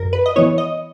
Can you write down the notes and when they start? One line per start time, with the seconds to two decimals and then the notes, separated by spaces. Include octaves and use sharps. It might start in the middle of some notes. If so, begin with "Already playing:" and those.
Already playing: F#2 A#4
0.13 B4
0.26 D#5
0.36 E3 B3 E4 C#5
0.58 D#5